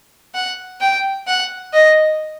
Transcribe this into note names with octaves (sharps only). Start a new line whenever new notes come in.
F#5
G5
F#5
D#5